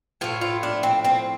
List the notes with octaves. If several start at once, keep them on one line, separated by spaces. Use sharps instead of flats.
A2 F3 A3 F4
F4
D4
C4
C4